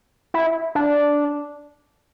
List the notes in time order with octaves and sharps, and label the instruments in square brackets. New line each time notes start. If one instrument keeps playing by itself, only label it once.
[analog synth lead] E4
D4